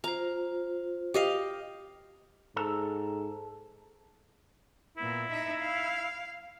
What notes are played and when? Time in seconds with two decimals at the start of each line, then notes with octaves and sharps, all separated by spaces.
0.04 F4 C5 A#5
1.14 G4 D#5 F5
2.56 G#2 A4 A5 A#5
4.98 A#2 B3 E4
5.32 D#4 E5
5.61 F5